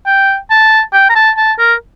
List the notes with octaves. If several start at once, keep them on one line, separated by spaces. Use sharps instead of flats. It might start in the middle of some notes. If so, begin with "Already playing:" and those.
G5
A5
G5
A#5
A5
A5
A#4